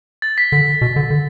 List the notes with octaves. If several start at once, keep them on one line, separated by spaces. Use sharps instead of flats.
A6
B6
D3 B6
B2
D3
D3